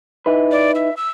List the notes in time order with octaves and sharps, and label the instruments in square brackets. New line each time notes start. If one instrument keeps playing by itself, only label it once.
[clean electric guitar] D#4 E4 B4
[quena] D5
E5
E6